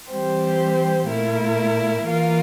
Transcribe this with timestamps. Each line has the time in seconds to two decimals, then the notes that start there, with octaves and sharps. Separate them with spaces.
0.11 E3 G3 C4 G4 C5
1.08 A#2 A3 E4 A#4
2.05 E3 A#3 F4 A#4